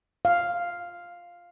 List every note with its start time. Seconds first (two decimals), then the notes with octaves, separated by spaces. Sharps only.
0.25 F5